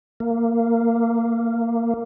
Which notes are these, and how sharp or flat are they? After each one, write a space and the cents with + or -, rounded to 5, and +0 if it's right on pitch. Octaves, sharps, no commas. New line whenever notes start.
A#3 -15